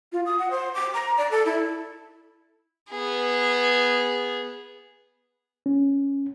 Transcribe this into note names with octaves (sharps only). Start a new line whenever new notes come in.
F4
D#6
F#5
C5
D6
A#5
D5
A4
E4
B3 G#4
C#4